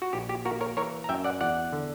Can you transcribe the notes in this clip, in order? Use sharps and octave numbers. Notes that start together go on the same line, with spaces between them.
F#4
A#1 G4
G4
A#3 F#4 A#4
A#4 C#5
E3 A#4 C#5
A#5
F#2 E5 G5
D5 F#5
E2 D5 F#5
D3